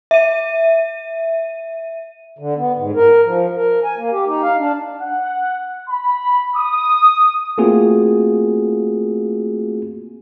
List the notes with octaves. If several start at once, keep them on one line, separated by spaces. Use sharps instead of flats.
E5 D#7
D3
B3
G#2
A#4
F3
A#4
G#5
A#3
G4
D#4
F5
D4
F#5
B5
D#6
A3 A#3 C4 F4 F#4 G#4